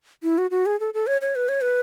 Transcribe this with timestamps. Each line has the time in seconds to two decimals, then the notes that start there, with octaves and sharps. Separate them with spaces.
0.23 E4
0.38 F#4
0.51 F#4
0.66 G#4
0.80 A4
0.94 A4
1.07 C#5
1.21 C#5
1.36 B4
1.49 C#5
1.61 B4